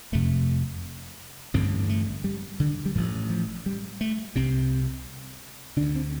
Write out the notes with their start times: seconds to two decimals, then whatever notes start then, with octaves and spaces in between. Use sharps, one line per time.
0.12 F1 F2 C3 A3
1.54 A1 G2 D3 C4
1.89 A3
2.24 G3
2.60 D3
2.86 G3
2.95 A1 A2 F3
3.30 F3
3.66 G3
4.01 A3
4.35 C2 C3 C4
5.76 D3 D4
5.80 D2
5.95 C4